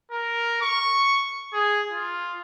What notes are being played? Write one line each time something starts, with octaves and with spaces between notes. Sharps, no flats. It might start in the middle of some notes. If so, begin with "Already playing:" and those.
A#4
C#6
G#4
F4